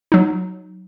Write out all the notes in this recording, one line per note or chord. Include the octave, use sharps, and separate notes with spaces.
F#3 D#4